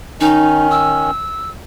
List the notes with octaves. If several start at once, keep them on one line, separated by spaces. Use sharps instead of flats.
D#3 C#4 D#4
E6